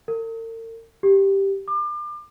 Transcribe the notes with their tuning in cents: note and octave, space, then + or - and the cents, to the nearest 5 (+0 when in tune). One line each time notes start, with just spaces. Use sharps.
A#4 -45
G4 +0
D6 +35